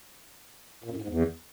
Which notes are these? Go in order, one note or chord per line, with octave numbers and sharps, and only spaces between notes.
A#2
F#2
A2
G#2
E2